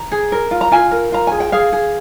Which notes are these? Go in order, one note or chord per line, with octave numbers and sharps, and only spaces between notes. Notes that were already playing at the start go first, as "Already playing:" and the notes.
Already playing: A#5
G#4
A#4
F4
A#5
F4 G#5
A#4
F4 A#5
G#4 G#5
G5
G#4 F5
G#4